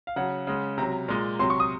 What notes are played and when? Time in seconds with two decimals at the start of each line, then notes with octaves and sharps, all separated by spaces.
0.07 F5
0.16 C#3 F#3 F#5
0.47 C#3 G#3
0.78 C3 F#3 A#5
1.08 A#2 G#3
1.39 C3 F#3 C6
1.50 C#6
1.60 D#6